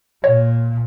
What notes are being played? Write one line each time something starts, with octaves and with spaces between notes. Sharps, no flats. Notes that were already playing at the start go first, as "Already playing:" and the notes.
A#2 C#5